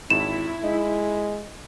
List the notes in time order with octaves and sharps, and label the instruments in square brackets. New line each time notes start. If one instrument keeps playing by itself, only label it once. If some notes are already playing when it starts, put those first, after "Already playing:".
[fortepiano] G#1 [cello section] E4 [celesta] E7
[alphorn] G#3 [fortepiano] D#4